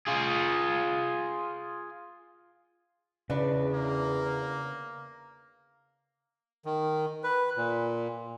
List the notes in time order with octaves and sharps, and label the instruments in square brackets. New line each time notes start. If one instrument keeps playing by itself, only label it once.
[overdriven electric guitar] F4 G#4
[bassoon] E2 [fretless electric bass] C#3 [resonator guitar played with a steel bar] D4 F#4 B4
[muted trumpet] A#3
[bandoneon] D#3
B4
A#2